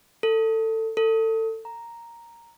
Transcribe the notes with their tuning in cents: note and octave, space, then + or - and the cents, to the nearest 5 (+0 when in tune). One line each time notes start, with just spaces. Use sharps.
A4 +20
A4 +25
A#5 +0